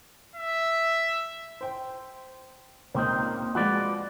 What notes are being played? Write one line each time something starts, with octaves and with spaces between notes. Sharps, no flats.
E5
C5 G5
C#2 A#2 A#3 C4 D#4
F3 G#3 F#4 B4 D5